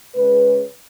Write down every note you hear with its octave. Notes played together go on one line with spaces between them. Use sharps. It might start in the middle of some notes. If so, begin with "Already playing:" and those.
C#3 G#3 B4